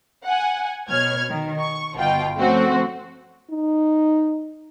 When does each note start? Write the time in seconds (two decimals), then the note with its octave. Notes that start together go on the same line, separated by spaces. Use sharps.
0.25 F#5 G#5
0.90 B2 C#5 F6 G#6
1.30 D#3
1.60 C#6
1.95 G1 B2 F4 G5
2.38 F3 A3 C4 C#4 F#4 C5
3.50 D#4